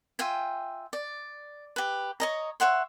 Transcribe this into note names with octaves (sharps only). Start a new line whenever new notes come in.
F4 E5 G5 G#5
D5
G4 B4
C#5 D#5 A#5
C#5 E5 F#5 C6